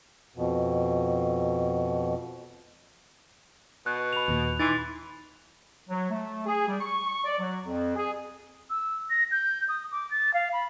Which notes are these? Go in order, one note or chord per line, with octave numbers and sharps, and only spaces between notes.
F2 B2
B2 F#6
B5 F7
D#2 A#2
E3 D#4 C6 D6 A6
F#3
A3
G#4
G3
C#6
C#6
D5
F#3
F2
G#4
E6
A#6
G6
D#6
D6
A6
F5
B5